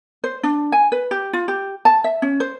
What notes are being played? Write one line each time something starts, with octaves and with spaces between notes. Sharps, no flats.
C5
D4
G#5
B4
G4
F4
G4
A5
E5
C#4
C5